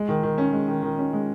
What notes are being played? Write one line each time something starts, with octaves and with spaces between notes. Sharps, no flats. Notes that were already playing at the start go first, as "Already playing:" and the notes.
Already playing: G#3
D#3
D#3
C#4
G#3
D#3
D#3
C#4
G#3